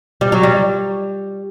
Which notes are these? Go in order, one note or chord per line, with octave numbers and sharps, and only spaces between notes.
G3
F#3
G3